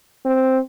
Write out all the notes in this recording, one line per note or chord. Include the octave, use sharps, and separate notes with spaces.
C4